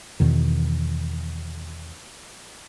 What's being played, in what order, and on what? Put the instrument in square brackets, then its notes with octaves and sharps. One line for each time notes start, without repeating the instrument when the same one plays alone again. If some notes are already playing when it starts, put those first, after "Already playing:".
[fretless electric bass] E2 B2 D#3